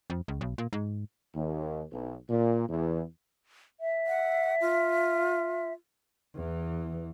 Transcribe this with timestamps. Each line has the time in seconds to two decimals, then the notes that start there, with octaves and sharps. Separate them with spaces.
0.10 F2
0.28 C#2
0.41 B1
0.58 A#2
0.73 G#2
1.34 D#2
1.91 B1
2.29 A#2
2.69 E2
3.80 E5
4.07 F#5
4.61 F4
6.35 E2 E3